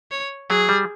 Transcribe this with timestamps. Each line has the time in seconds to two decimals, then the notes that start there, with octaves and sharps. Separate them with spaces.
0.11 C#5
0.50 F#3 G#4
0.69 G3